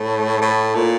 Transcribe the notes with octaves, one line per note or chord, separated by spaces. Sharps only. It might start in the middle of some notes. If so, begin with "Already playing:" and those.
Already playing: A2
A2
A#2